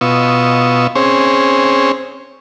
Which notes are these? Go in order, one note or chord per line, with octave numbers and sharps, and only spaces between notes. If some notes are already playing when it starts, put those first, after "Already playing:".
B2 B3 F4 D#5 C#6 E6
C4 C#4 G#4 C5 C#5